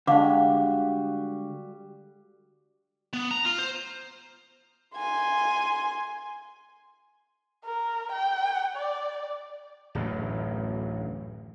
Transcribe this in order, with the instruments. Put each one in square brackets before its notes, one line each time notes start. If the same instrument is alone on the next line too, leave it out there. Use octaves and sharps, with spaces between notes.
[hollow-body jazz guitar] D3 G#3 [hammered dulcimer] G3 F#4 G4 [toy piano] F5 D6
[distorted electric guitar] B3
A#5
F4
C5
[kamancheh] G#5 C6
[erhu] A#4
G5
D5
[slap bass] D1 A1 F#2